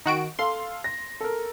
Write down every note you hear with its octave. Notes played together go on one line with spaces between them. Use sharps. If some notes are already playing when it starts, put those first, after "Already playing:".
D#3 F#4 D7
A4 F5 C6
A#6
A4 A#4